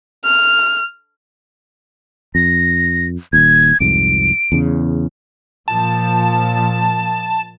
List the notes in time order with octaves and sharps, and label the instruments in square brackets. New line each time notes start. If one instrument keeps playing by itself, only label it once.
[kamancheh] F6
[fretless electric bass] F2 [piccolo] A#6
[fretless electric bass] D#1 D#2 [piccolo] G#6
[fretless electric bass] C2 F2 G#2 [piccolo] D7
[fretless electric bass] E2 C#3
[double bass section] A#2 F3 [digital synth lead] A5